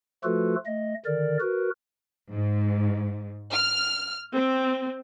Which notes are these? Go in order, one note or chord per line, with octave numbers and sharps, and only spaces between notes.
F3 A3 F4 F#4 A4 B4
A3 D#5
D3 D#3 A#4 D5
F#4 A#4 B4
G#2
F6
C4